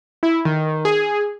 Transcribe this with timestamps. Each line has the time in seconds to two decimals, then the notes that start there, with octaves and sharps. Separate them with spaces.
0.23 E4
0.45 D#3
0.85 G#4